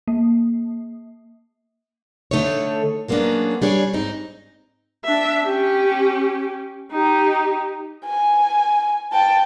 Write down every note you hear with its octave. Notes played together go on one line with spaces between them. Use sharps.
A#3
D3 A3 D#4 A4 C#5
F#3 G#3 A#3 B3 C#4 D4
G3 D4 G#4 C#5
G#2 C4 D#4
D4 E5
C#4 G4
D#4 G4
G#5
G5 A5